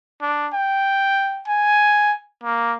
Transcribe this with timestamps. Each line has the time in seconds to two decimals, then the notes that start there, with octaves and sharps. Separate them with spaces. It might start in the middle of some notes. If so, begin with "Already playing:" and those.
0.21 D4
0.53 G5
1.48 G#5
2.43 A#3